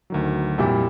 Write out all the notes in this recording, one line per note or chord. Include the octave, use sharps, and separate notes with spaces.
D2 D#3 F#3
F2 A#2 F#3 G3 E4 G4